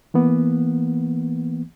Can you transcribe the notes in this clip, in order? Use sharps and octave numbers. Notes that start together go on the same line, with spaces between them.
E3 A#3 B3